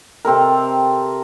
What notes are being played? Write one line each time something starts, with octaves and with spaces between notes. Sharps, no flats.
C3 C4 A4 A#4